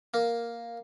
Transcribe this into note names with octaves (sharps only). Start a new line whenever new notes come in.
A#3